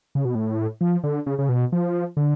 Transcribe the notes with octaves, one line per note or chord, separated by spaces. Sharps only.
C#3
B2
A2
F3
D3
C#3
C#3
B2
F3
D3